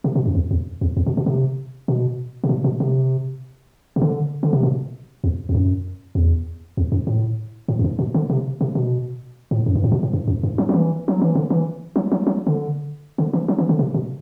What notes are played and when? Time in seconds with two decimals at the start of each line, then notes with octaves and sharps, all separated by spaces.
0.04 C3
0.15 B2
0.26 F#2
0.35 E2
0.51 E2
0.81 E2
0.97 E2
1.06 B2
1.17 B2
1.26 C3
1.88 B2
2.44 C3
2.49 B2
2.64 B2
2.80 C3
3.96 C3
4.02 D3
4.43 D3
4.53 C3
4.63 B2
5.24 E2
5.49 E2
5.55 F#2
6.15 E2
6.77 E2
6.92 F#2
7.07 A2
7.68 A2
7.79 F#2
7.84 G2
7.99 B2
8.14 D3
8.30 C3
8.61 C3
8.75 B2
9.51 A2
9.66 F#2
9.75 G2
9.84 A2
9.92 B2
10.03 A2
10.13 G2
10.28 F#2
10.43 G2
10.58 F#3
10.69 F#3
10.74 E3
11.08 F#3
11.22 E3
11.35 D3
11.50 E3
11.96 F#3
12.12 F#3
12.27 F#3
12.47 D3
13.18 D3
13.33 E3
13.48 F#3
13.58 E3
13.69 D3
13.79 C3
13.94 B2